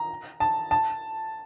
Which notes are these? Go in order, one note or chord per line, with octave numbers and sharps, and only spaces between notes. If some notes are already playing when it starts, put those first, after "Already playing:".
Already playing: A#5
A5
A5